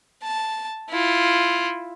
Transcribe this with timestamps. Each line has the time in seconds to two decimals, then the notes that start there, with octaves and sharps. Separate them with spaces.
0.23 A5
0.90 E4 F4